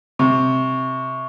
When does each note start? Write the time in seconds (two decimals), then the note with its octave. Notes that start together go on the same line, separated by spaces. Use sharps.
0.19 C3 C#6